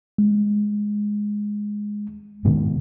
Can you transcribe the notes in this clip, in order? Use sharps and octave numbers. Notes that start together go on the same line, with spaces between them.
G#3
G#2 B2 D#3